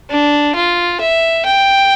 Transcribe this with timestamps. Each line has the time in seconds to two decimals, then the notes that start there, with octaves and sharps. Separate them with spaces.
0.10 D4
0.55 F4
1.01 E5
1.46 G5